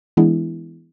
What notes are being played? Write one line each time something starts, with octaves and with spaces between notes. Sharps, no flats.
E3 G#3 B3 D4 E4 G#4